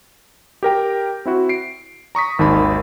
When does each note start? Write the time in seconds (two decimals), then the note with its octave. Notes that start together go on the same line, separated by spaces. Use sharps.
0.63 G4 A#4 G5
1.25 C4 E4 F#4
1.49 C7 D7
2.15 A#5 C#6 D#6 B6
2.39 G#1 D#2 D#3 B5